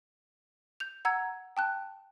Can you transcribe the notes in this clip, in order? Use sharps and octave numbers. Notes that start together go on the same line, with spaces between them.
G6 F7
F#5 A#5 E6 G#6
G5 A5 F#6